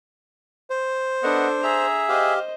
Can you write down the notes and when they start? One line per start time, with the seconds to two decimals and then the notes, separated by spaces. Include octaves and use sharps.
0.70 C5
1.23 B3 D4 A4 D#5 F#5
1.63 G#4 E5 A#5
2.09 G4 C5 D#5 F5